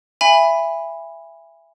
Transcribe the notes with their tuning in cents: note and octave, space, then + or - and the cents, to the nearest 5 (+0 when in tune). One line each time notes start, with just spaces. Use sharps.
E5 +20 G#5 -20 B5 +0